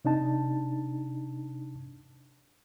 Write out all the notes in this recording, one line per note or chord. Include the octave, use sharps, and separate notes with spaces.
C3 D4 D#4 A5